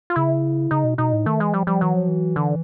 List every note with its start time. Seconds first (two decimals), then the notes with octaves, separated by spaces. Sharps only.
0.10 F4
0.16 C#3 E4
0.71 C#3 D#4
0.84 B2
0.98 B2 D#4
1.13 A2
1.26 D#3 A3
1.40 E3 G#3
1.54 F3 G3
1.67 F3 G3
1.81 E3 F#3
1.94 F3
2.08 E3
2.36 D3